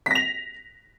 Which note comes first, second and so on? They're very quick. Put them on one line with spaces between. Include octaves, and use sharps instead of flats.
B6 A#6 F7